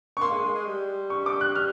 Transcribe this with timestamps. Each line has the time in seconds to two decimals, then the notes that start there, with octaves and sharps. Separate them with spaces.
0.17 C#6
0.21 A#3 C6
0.33 G#3
0.44 G#3
0.54 G#3
0.66 G3
1.10 C#6
1.26 D6
1.41 F#6
1.55 G3 F6